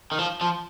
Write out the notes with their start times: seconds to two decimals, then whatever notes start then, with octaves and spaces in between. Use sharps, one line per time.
0.12 D#3
0.19 F3
0.41 F3